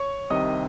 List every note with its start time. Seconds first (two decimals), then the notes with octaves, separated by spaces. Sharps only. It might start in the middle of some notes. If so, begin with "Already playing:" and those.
Already playing: C#5 C#6
0.30 C2 C3 D#3 D#5 D#6